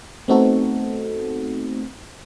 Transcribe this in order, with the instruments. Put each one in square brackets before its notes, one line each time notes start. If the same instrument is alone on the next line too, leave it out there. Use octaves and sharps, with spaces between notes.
[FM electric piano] A3 B3 C4 D#4 F#4 A4